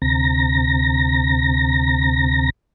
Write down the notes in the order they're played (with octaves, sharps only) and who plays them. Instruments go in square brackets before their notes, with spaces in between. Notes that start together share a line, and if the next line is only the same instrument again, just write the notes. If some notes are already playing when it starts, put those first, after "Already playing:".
[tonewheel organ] D2 C3 A#5 A#6